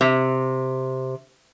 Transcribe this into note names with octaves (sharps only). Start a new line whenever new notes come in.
C3